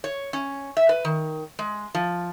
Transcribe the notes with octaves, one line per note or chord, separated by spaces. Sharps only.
C#5
C#4
E5
B4
D#3
G#3
F3